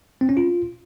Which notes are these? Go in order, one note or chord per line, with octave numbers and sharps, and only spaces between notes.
C4
C#4
F4